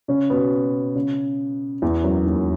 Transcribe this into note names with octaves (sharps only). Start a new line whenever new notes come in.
C#3 C#4
B2 B3
C#3
E2 E3
F#2 F#3
D#2 D#3